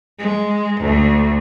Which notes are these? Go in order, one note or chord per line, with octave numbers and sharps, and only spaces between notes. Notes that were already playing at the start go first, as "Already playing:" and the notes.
G#3
D2